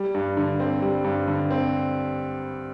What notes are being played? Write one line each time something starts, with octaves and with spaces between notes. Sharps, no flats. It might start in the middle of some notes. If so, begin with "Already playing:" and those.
Already playing: G3
G2
D3
C4
G3
G2
D3
C4